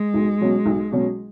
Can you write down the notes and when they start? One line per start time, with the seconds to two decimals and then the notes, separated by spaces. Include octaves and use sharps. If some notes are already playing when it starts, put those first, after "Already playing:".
Already playing: G#3
0.14 B1
0.40 B2 F#3 C#4
0.66 B1
0.92 B2 F#3 C#4